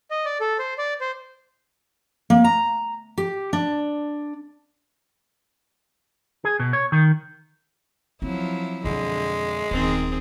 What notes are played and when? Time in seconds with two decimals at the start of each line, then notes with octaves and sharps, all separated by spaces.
0.11 D#5
0.25 D5
0.40 A4
0.59 C5
0.78 D5
1.01 C5
2.30 A#3
2.44 A#5
3.18 G4
3.53 D4
6.45 G#4
6.60 B2
6.73 C#5
6.92 D#3
8.22 F3 F#3 C4 E4
8.85 F2 B2 D3 G#3
9.71 D#1 F#2 D#3 C4 G#4